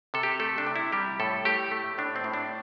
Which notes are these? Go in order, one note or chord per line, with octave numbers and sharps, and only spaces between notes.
C3 A4
G4
A3 A4
D4
C3
E4
G3 G4
A2 A4
A3 G4
A3
A2 D4
C4
A2
D4